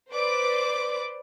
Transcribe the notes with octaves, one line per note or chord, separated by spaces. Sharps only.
B4 C5 D5 D6